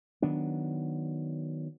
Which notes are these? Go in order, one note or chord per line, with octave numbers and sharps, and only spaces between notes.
D#3 F#3 B3 D4